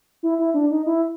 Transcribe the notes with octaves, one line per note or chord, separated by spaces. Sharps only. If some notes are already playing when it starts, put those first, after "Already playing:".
E4
E4
D4
D#4
E4